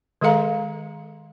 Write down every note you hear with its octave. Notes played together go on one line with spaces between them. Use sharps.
D#3 G#3 G#4 A4 F5 A#5